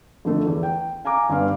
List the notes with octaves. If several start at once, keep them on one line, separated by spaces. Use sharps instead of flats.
F2 D3 A3
E2
G5
F5 G#5 A#5 D6
G1 G2 F5